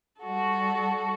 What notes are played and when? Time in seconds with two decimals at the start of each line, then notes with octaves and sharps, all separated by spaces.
0.21 G3 F#4 A4